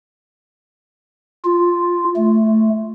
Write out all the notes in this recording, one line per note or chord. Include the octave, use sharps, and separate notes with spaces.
F4
A3